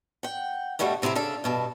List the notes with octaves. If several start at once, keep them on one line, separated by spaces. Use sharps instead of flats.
F#5 G5
G2 B2 G3 A3 F#4
A2 C3 C4 E4 G4
C#3 D4 A4
G2 B2 A5